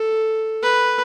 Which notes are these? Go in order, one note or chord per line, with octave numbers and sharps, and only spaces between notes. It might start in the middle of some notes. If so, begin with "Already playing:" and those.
Already playing: A4
B4